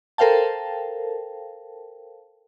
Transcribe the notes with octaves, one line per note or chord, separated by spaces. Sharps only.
A4 A#4 C5 F5 G5 A5